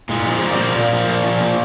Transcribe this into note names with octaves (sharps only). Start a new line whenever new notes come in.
A#2 G#3
F3 G#3
A#2 A#3
C4
F3 A#3
A#2 A#3
F3
A#2
F3
A#2